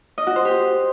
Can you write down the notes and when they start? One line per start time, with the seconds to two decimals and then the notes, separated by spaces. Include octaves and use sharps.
0.18 D#5
0.27 F#4
0.36 C5
0.45 G4